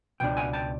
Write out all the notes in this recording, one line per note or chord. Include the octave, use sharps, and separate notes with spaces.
C#2 B2 D4 G5
F#5 G#5
G5 A5